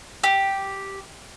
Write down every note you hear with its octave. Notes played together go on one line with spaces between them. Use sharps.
G4